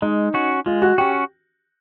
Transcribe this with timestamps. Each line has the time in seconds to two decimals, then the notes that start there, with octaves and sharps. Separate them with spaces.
0.02 G#3 D#4
0.34 C#4 F#4
0.66 G#3 F4
0.82 F#4
0.98 C#4 F#4 G4